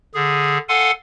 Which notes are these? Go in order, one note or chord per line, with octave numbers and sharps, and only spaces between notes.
D3 G#4
A4 F5 F#5 G#5 C6